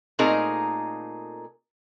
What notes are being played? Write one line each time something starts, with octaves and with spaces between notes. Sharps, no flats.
A#2 A3 C4 D#4 G#4 A#4